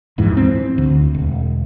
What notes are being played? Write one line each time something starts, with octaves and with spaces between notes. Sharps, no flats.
D1 F2 G#2 E3
C4
D2
E1